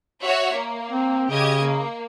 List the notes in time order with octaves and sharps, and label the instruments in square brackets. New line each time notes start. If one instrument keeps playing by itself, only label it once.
[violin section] F#4 C#5 E5
A#3
[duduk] C4
[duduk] C#3 [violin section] G4 D#5 G#6
[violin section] A#3